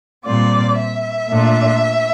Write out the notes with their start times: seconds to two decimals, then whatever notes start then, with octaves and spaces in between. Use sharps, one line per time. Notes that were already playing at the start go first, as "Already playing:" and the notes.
0.24 A#2 G3 C4 F4 D5
0.77 E5
1.28 A#2 A3 D4 F4